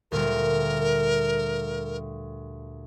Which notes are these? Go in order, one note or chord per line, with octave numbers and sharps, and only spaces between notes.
D2 A#2 G3 A#4